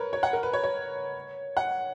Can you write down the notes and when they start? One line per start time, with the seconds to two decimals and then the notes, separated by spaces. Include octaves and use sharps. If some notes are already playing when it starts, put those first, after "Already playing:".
Already playing: A#4 B4 C#5
0.13 C#5
0.23 F#5
0.33 A#4
0.43 B4
0.53 C#5
0.63 C#5
1.57 F#5